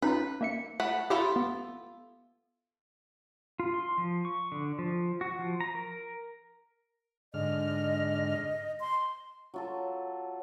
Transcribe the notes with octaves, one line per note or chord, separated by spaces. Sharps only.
C#4 D#4 F4 B4
A#3 E5 C#7
A3 F#5 B5
E4 F4 G4 A4
B3
F4
C6
F3
C#6
D3
F3
F#4
F3
A#5
A#4
G#2 D3 D#5 F6
C6
F#3 F4 A4